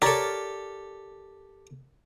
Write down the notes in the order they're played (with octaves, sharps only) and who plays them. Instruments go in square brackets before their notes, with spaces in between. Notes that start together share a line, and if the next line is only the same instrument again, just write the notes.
[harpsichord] G4 A4 [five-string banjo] A#4 C#5 D5